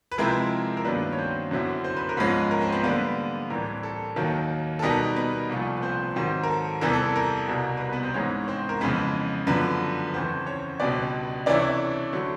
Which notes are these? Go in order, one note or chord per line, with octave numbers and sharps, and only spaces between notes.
B4
C3 F3 G#3 C4 E4 A#4
A#4
G2 D#3 F#3 A#3 B3 D4 B4
C#5
C4 C5
F#2 D3 F#3 B3 E4
C5
B4
A#4
G#2 F3 G#3 B3 C#4 B4
A#4
C4 C5
B3 B4
D3 G3 A#3 B3 B4
A2 E3 G3 C4 A#4
A4
D#2 D#3 F#3 A#3
A4
B2 G3 B3 D#4 A#4
B3 B4
C2 A#2 F3 A3
B4
C4 C5
G#2 D#3 F#3 C4 C5
A#4
A4
E2 C3 E3 G3 B3 A#4
A4
A#4
C2 B2 G3
B4
A#4
B3 B4
C4 C5
G#2 E3 G#3 B3 C#4 D#4 C#5
C#5
C4 C5
A#4
F2 C#3 E3 G#3 B3 B4
F#2 D3 F3 B3 B4
B4
E2 C#3 E3 A3 C4 C5
C#4 C#5
C#2 B2 G3 B3 D4 D5
C3 E3 A3 C#4 D4 E4 D5
D3 F#3 A3